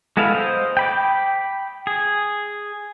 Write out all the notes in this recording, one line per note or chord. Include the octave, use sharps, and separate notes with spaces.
G#3 B3 E4 A4 F5
C5 D#5
G5 B5 D6
G#4